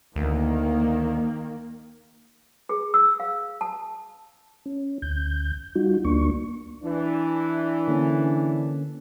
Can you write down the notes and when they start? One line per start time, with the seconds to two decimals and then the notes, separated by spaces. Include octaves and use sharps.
0.16 D2 D#3 A#3
2.69 G#4
2.94 E6
3.20 F5
3.61 A5
4.66 C#4
5.02 D2 G6
5.75 G3 D#4 F4 F#4
6.05 D2 A#3 D4 C#6
6.84 E3 D4
7.88 D3 A#3 C#4